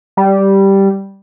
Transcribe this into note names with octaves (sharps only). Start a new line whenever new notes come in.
G3